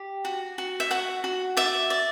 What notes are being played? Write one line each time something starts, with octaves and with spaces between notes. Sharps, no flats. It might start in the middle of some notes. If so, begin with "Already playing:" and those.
Already playing: G4
F#4
F#4
E5
F#4 F#5
F#4
D5 E5
D5